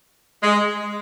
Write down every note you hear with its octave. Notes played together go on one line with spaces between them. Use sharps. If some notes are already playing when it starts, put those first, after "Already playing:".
G#3